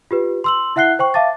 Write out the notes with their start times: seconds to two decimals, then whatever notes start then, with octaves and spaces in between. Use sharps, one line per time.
0.11 F4 G4 B4
0.44 C6 E6 F#7
0.76 E4 E5 F#5 F#6 C7 G7
0.99 C5 G5 C#6
1.14 E5 F5 A5 D6 A6